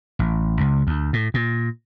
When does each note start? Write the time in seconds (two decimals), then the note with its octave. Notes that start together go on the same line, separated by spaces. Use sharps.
0.19 A1
0.61 C#2
0.87 D2
1.13 A2
1.34 A#2